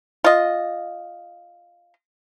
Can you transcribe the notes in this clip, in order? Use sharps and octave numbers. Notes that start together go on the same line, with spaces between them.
F4 D#5